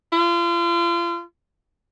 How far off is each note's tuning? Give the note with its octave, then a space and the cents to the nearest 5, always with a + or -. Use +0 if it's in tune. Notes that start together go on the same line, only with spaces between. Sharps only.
F4 -35